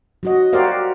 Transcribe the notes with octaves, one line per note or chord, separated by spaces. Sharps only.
F#3 F#4 D#5
F#4 G4 A#4 C5 D5 F5